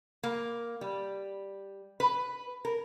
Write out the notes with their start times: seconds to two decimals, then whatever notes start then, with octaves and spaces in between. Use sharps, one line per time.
0.23 A#3
0.81 G3
2.00 B4
2.65 A#4